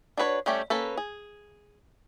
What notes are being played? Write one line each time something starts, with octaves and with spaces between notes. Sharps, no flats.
D4 F#4 B4 C#5
G3 A3 C#4 G4
A#3 C#4 A4 B4
G#4